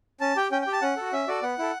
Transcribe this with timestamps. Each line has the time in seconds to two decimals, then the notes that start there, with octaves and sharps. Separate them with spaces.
0.21 C#4 A5
0.36 G4 G5
0.51 C#4 G5
0.62 G5
0.67 G4
0.72 A5
0.82 C#4 F#5
0.97 F#4 A4
1.13 C#4 E5
1.28 F#4 A4 D5
1.42 B3 F#5
1.59 E4 A4